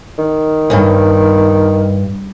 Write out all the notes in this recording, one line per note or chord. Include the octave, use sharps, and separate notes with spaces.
D#3
D2 G2